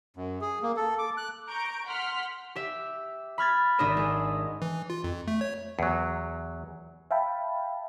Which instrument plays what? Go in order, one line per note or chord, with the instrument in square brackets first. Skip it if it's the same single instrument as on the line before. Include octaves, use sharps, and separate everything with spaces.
[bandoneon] F#2
G#4
A#3
A4
D6
F#6
[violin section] A#5 C#6 G6 D7
F#5 C6 F6 B6
[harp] G4 E5
B5 F6 G#6 A6
G#1 D4 G4 D#5 E5 D#7
G#3 G#4
[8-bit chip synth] E3
F4
F2
A3
C#5
[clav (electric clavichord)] E2 F#3
[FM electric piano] E5 F5 G5 A5 B5